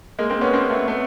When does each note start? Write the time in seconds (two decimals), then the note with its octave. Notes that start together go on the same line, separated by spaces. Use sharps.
0.19 G#3 A#3
0.30 A#3 C4
0.41 B3 C#4
0.53 A#3 C4
0.70 A3 B3
0.88 A3 B3